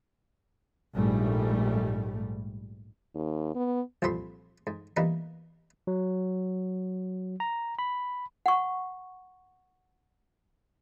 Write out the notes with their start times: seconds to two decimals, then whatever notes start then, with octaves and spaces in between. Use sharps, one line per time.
0.96 A#1 G#2 G3 A3
3.15 D#2
3.55 B3
4.02 C2 F2 A#2 C5 B5 C6
4.67 G#2
4.97 E3 G3 A#3 B3 D#4 E4
5.87 F#3
7.40 A#5
7.79 B5
8.46 F#5 C#6